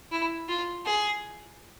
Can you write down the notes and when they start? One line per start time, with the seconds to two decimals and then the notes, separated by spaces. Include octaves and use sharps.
0.12 E4
0.49 F4
0.85 G#4